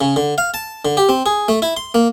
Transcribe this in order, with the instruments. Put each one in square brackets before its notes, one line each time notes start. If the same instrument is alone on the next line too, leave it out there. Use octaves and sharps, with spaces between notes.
[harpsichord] C#3
D3
F5
A5
D3
G4
C4
G#4
A3
E4
C6
A#3